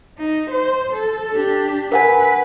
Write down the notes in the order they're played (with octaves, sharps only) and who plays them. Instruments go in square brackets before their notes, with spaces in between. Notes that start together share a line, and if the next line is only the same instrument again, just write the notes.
[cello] D#4
C5
A4
D4 G4
[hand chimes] A#4 F#5 G#5 [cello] B4